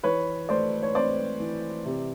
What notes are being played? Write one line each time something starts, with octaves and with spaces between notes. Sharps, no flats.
E3 B4 C#5
A3 C5 D5
C#5
C4 C5 D5
E3
C3